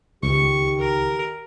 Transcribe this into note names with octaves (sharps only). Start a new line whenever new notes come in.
C#2 D#3 D#4 G4 C#6
A#4